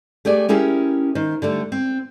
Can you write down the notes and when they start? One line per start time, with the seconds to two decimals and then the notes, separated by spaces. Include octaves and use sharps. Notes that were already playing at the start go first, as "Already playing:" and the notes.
0.25 A3 G4 G#4 D5
0.49 C#4 E4 G4 G#4 A#4
1.15 D#3 C5
1.42 D3 G3 A3
1.72 C4